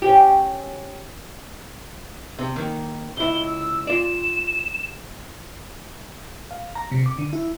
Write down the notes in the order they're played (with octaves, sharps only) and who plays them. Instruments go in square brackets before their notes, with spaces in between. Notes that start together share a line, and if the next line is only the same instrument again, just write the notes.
[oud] C#4 G4
[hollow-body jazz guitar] C3
D#3 A#3
[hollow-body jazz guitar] C#2 E4 [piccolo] G7
[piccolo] E6
[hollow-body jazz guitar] F4 D5 [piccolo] E7
[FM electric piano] F5
A#5
C3
D6
D3
E4